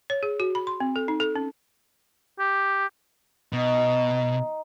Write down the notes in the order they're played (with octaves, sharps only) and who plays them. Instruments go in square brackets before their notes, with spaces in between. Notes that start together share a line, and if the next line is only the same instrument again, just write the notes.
[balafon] C#5
G#4
F#4
B5
C6
C4
A4
D#4
A4
C#4
[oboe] G4
[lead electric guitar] B2 [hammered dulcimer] D#4